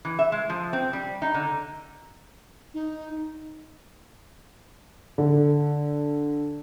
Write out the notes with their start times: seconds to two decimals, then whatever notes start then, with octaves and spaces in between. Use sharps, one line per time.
0.05 E3
0.19 E5
0.32 G#3
0.50 F3
0.73 C4
0.93 G3
1.22 D#4
1.34 D3
2.74 D#4
5.18 D3